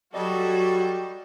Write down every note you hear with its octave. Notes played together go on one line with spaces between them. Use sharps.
F#3 G3 F#4 G4 A4 D5 D#5